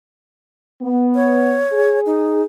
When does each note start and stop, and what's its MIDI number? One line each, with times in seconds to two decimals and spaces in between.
0.82 1.59 59
1.15 2.00 73
1.72 2.43 68
2.06 2.43 63